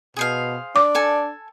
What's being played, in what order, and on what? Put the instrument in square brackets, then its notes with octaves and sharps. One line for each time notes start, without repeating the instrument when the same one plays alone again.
[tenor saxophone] B2 [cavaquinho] G#4 C5 F5
[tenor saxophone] D4 [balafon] D6
[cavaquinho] A4 G#5 A5